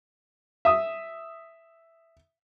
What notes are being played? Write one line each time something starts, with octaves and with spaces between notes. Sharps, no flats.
E5 D#6